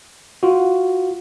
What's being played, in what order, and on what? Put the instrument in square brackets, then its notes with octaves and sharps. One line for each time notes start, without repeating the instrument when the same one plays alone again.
[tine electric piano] F4 F#4